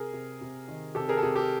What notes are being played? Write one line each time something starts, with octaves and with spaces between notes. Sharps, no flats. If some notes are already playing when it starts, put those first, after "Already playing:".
Already playing: C3 G#4 A#4
C3
C3
D#3
C3 G4 A4
G#4 A#4
A4
C3 G#4
G4 A4